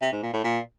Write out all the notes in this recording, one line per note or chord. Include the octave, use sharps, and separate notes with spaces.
C3
G#2
A#2
A2
A#2